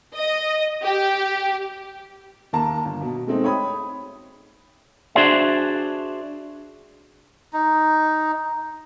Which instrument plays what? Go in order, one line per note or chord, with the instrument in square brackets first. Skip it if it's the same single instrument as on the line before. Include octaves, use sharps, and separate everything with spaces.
[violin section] D#5
G4
[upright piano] D#2 A#3 A5 A#5
G1
B2
G#3 A3 C4 D#4
C#5 G5 B5 D#6
[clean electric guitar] D4 F#4 G#4 C5 D5 E5
[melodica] D#4